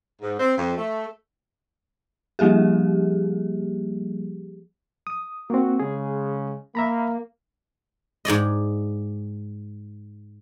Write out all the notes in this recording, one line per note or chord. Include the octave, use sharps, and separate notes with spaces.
G#2
C4
F2
A3
F3 G3 A#3 G4 G#4
D#6
A#3 C4 F#4
C#3 G#3 G#4
A#3 E5 A#5 B5
G#2 G#4 D5 D#5